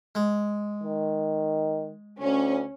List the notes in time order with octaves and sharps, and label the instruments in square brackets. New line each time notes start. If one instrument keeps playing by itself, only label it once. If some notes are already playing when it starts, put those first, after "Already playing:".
[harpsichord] G#3
[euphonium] D#3
[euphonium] D2 [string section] C#4